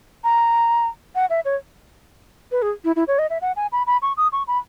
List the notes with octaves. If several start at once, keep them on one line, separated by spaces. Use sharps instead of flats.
A#5
F#5
E5
C#5
B4
G#4
E4
E4
C#5
D#5
E5
F#5
G#5
B5
B5
C#6
D#6
C#6
B5